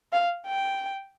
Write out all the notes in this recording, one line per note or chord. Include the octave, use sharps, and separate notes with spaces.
F5
G5